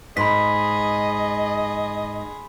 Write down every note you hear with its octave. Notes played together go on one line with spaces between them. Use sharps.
G#2 G#4 D#5 B5 C6 B6